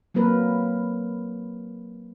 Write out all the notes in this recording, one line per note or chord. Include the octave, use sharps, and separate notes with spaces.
F#3 A#3 C4 A#4 B4